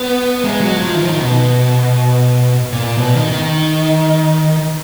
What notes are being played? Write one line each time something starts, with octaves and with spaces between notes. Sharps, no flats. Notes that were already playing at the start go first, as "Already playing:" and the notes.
Already playing: B3
G#3
F#3
F3
D#3
F3
D#3
B2
A#2
B2
D#3
D#3